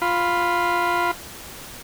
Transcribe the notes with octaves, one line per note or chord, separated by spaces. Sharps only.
F4 B5